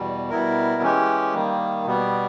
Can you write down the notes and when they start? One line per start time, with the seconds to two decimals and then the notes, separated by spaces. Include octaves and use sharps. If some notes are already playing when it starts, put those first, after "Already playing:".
Already playing: E2 B2 G3
0.30 B2 G3 B3 E4 A#4
0.82 E3 G#3 C#4 G4
1.34 D#3 G3 A#3
1.86 B2 G3 B3